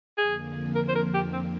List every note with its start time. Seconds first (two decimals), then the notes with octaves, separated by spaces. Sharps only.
0.18 F2 D3 F3 A#3 G#4
0.75 A#4
0.88 C5
0.95 A#4
1.14 G4
1.33 C4